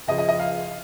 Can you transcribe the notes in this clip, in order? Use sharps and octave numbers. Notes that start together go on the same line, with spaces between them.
C#2 C#3 F3 D#5
D#5
D#5
F5